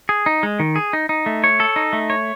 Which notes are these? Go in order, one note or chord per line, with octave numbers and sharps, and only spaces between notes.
G#4
D#4
G#3
D#3
G#4
D#4
D#4
A3
C#5
A4
D#4
A3
C#5